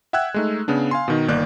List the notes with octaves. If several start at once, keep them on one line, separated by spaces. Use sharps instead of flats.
E5 F#5 G5 E6 F#6 G#6
G#3 A3 D#4
C#3 B3 D4
F5 G#5 C6
B2 D#3 D#4
G1 D#3 A#3 D5 F#6 G6